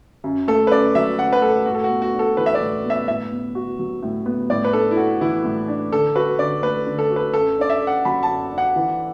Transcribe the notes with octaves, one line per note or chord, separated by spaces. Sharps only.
F#2
A3 A4
B4
F#2 D5
F#3 E5
F#2 F#5
B4
A3 A4
A2 F#4
A4
F#4
B3
F#4
D4
A4
E3 B4
E5
D5
A2
B3
E5
A2 E5
B3
F#4
F#3
A2
B3
A2 D5
B4
D4 A4
E4
F#4 A4
E3 E4
A2
D4
D3 A4
F#4 B4
D3 D5
A3 B4
D3
A4
F#4
B4
F#2 A4
D4 D5
E5
A4
F#5
F#3 B5
A5
F#2
D4
F#5
E3